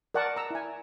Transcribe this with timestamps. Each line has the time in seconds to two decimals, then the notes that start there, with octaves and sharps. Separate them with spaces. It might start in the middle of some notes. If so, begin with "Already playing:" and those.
0.14 A#4 D5 F#5 A5 C#6
0.36 A#5 E6
0.51 E4 G#5